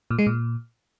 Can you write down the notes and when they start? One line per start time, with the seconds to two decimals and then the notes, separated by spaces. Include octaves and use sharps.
0.11 A#2
0.19 G#3
0.27 A#2